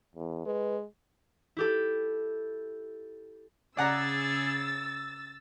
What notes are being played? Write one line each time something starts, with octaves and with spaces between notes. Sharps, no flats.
E2
G#3 B4
E4 G4 A4
C#3 G#4 D5 F#5 A#5 E6 A6